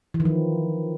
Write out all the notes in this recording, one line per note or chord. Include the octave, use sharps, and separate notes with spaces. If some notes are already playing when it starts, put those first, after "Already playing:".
E3
D#3
F3